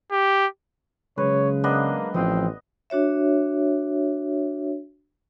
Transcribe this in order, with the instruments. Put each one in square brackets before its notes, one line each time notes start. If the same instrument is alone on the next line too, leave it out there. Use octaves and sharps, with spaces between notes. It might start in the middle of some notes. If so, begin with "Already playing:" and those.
[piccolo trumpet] G4
[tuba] C#3 [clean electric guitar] F#3 G#3 [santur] B4 [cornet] C#5
[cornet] A#3 [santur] B3 D4 D#5
[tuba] A1 [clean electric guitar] F3 F4 C5 [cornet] C4 [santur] D#6
[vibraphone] D4 F#4 C#5 E5